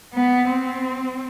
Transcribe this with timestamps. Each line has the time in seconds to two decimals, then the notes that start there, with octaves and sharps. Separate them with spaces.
0.14 B3
0.49 C4